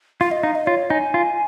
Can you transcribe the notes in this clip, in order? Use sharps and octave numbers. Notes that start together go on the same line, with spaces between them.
F4 F5
D#5
D#4 F5
D#5
F4 C#5
D#4 G#5
F4